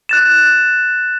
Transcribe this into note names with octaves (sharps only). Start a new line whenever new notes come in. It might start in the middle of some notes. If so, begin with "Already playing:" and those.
F#6 A6 E7